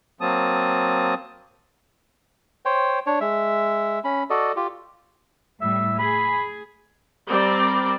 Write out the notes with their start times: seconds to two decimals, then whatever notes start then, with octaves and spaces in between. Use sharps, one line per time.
0.21 F#3 A#3 C4 A5 D#6
2.65 C5 C#5 G5
3.06 D4 C#5
3.21 G#3 E5
4.04 C#4 B5
4.30 F#4 A4 D5 D#5
4.56 F4 G4
5.61 A2 G3 E5
5.99 G#4 B5
7.28 G3 C4 A#4 D5